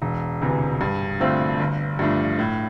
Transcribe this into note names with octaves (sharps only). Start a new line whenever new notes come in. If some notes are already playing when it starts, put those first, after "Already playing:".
E1
D2 C3 E3
G2
D3 A3 C4 F4
G1
G2 F3 A3 D4
A2